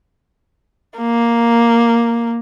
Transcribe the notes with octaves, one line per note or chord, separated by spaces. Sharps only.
A#3